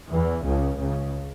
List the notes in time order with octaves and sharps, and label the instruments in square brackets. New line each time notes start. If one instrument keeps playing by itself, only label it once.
[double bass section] E2 E3
C#2 C#3
C#2 C#3